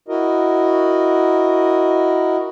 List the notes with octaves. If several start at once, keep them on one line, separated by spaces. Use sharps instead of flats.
E4 F#4 A#4 D#5